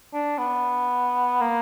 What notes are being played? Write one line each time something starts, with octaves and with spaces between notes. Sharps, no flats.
D4
B3
A#3